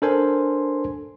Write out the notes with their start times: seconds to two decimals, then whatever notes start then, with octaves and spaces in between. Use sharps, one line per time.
0.02 D4 A4 A#4 C5 G#5 C6